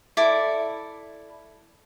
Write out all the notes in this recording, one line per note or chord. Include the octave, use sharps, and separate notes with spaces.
E4 A4 D5 D6